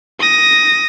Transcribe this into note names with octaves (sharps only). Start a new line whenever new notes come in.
D#6 A#6